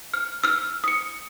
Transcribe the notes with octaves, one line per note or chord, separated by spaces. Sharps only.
F6
E6 F6
D#6 C#7